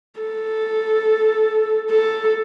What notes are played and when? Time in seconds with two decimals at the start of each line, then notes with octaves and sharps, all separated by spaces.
0.20 A4
1.91 A4